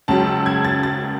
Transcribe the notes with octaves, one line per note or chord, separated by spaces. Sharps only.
C#2 C#3 F#3 A5
E6
G#6
A6
A6